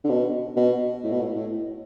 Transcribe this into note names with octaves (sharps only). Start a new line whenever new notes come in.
D3
B2
B2
A2
B2
A2
A2